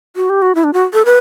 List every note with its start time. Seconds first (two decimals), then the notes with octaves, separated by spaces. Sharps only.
0.16 F#4
0.30 G4
0.42 F#4
0.55 E4
0.64 D4
0.73 F#4
0.94 A4
1.05 B4